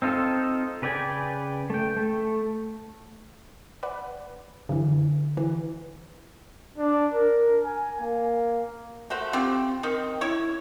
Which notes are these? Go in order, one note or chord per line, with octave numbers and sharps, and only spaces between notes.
C4 D#4 F4 A4
C#3 B4 D5 G5 G#5
A3 G5
A3
B4 D5 F#5
F#2 D3 E3
E3
D4
A#4
G#5
A#3
A3 F#4 C5 E5
C4 F4 G4
D#3 C4
E4 C#5 C#6